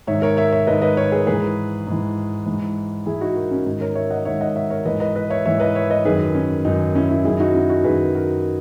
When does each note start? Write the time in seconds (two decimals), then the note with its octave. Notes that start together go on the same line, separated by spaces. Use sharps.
0.07 G#2 D#3 C#5 E5
0.22 A#4 C#5
0.37 C#5 E5
0.52 C#5 E5
0.67 G#2 D#3 B4 D#5
0.82 B4 D#5
0.97 A#4 C#5
1.12 G#4 B4
1.27 G#2 E3 G#4 B4
1.87 G#2 E3
2.46 G#2 E3
3.06 G#2 E3 E4 G#4
3.21 D#4 F#4
3.36 F#4 A#4
3.51 C#4
3.66 G#2 D#3 D#4
3.81 A#4 C#5
3.95 C#5 E5
4.10 D#5 F#5
4.25 G#2 D#3 C#5 E5
4.41 D#5 F#5
4.56 C#5 E5
4.70 A#4 C#5
4.85 G#2 E3 B4 D#5
5.00 B4 D#5
5.16 B4 D#5
5.30 C#5 E5
5.45 G#2 E3 C#5 E5
5.60 B4 D#5
5.75 C#5 E5
5.90 B4 D#5
6.05 F#2 D#3 G#4 B4
6.35 C#4
6.65 F#2 D#3 D#4
6.95 C#4 E4
7.09 C#4 E4
7.25 F#2 D#3 E4 G#4
7.40 D#4 F#4
7.55 C#4 E4
7.69 D#4 F#4
7.84 F#2 D#3 G#4 B4
8.15 F#4 A#4